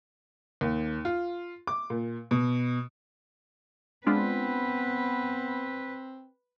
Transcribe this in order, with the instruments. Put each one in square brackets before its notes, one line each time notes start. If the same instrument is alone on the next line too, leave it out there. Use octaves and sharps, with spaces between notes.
[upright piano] D#2
F4
D6
A#2
B2
[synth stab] G#3 D4 F4 [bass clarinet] B3 [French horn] C4 [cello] B4